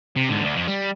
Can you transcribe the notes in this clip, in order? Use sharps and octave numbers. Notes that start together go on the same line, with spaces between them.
C3
G#2 D3
D2 D3
F2
G3